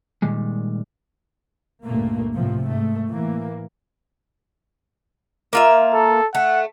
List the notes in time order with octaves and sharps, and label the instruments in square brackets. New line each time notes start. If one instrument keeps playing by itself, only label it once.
[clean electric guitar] A#2 D#3 G3 G#3
[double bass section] C#2 G2 A#2 A3 A#3
A2 C3 F3
G#2 A3
A2 E3 A#3
[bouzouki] A#3 F4 E5
[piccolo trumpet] A4
[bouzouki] A3 [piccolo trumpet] F#5